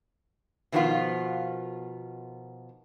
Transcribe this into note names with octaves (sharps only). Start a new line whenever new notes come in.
B2 D#3 F3 A3 B3 F4